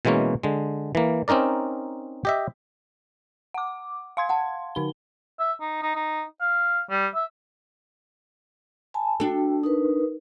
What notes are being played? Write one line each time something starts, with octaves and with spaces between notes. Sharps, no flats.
B2 E3 G#3 A#3 C#4
D3 G#3
E3 A#3
C4 C#4 D#4 A#4 D5
G4 D#5 E5
F#5 D6
F5 C6 G#6
F#5 A5
D3 D#4 G7
E5
D#4
D#4
D#4
F5
G3
E5
G#5 A5 B5
D4 F#4 A4 G5
D#4 A#4 B4